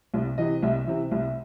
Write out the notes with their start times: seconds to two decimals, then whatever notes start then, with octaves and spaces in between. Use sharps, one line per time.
0.14 C2
0.38 C3 E3 D#5
0.62 C2 E5
0.87 C3 E3
1.11 C2